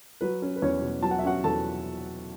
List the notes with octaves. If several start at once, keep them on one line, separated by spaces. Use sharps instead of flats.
F#3 B4
C#4
B4
E2 C#4 C#5
B2
F#3 A5
F#5
E5
C#4 F#4 F#5
E2 A4 A5